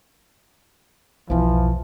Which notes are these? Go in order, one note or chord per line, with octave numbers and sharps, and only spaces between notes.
B1 E2 E3 F3